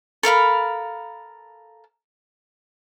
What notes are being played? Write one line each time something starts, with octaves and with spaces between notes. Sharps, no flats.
A4 A#4 F5 B5